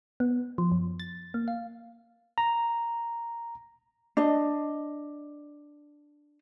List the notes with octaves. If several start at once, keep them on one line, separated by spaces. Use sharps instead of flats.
B3
F3
F#2
A6
A#3
F5
A#5
D4 D#5